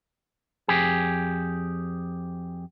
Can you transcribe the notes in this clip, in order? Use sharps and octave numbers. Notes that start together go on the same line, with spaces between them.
F2 G4 G#4